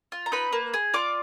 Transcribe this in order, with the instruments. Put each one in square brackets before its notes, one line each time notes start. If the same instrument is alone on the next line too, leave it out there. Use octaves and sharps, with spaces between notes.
[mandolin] F4
A#5
D#4 B4 B5
A#3
G#4
F4 D5 D6